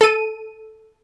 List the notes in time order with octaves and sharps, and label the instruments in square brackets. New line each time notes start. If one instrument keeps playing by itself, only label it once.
[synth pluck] A4 D#7